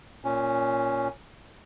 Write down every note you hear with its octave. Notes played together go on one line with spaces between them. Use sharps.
A#2 C#4